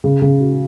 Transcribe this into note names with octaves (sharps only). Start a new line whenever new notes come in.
C#3
C#3
F#4